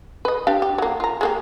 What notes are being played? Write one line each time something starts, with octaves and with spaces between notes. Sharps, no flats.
B4 D#5
D4 G4 F5
G4
F#3 A#3
F4 A#5
G#3 A#3 G4